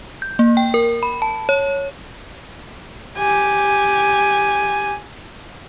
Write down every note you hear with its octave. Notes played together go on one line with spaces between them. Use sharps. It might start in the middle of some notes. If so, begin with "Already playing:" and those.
G6
A#3
G5
A#4
B5
A5
C#5
G4 G#5